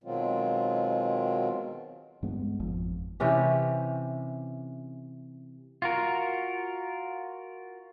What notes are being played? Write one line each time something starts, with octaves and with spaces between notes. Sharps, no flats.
B2 D#3 F#3 G#3 C4 F4
G2 G#3 B3
G#1 F2 F3
C3 E3 C#4 G4
F4 F#4 A#4